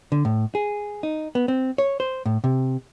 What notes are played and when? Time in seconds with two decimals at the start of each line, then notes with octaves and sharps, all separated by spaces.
0.12 D3
0.25 A2
0.55 G#4
1.03 D#4
1.35 B3
1.48 C4
1.78 C#5
2.00 C5
2.26 A2
2.44 C3